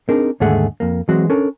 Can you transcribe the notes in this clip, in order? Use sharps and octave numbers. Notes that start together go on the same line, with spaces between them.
C4 D4 D#4 G#4 A#4
D#2 G#2 D3 A3 G#4 F#5
F2 A#3
E3 F#3 G#3 C4 F#4
C#4 D4 A4 A#4